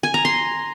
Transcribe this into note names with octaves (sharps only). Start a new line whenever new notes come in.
G#5
A#5
C6